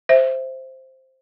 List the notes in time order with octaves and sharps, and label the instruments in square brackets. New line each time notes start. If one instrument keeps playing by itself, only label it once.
[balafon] C5 E5